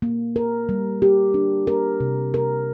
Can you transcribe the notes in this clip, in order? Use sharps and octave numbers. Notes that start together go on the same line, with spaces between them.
A#3
A#4
G3
G4
D4
A#4
C3
A#4